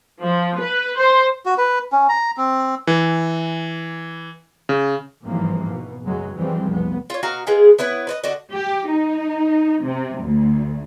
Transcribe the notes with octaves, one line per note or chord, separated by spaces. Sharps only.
F3
B4
C5
F#4
B4
C#4
A#5
C4
E3
C#3
G#1 G2 E3 F3 A#3
B2
F#1 C#2 F#2 C#3 F#3 G#3
F#2 E3 F3 G3 G#3 C4
F1 B1 B3
F4 C#5
B2 F#4 F5 A#5
G#3 B3 F4 G#4
B3 E4 B4 C#5
B4 C5 D#5
D3 F#4 D#5
G4
D#4
C3
D2